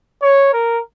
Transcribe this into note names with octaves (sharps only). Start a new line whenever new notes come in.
C#5
A#4